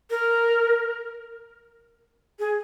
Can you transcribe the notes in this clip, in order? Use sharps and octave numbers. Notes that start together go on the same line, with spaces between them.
A#4
G#4